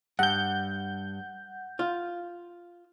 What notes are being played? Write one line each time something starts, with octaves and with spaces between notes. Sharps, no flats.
G2 F#5 G6
F4